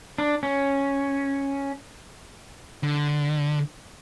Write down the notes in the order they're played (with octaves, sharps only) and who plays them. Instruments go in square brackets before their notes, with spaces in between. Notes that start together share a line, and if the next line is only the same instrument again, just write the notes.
[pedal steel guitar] D4
C#4
[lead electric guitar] D3